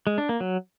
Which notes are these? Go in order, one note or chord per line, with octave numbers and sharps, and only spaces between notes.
G#3
D4
A#3
F#3